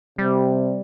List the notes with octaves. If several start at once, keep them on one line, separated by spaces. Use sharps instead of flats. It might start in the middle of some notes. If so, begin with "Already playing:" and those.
C3 G3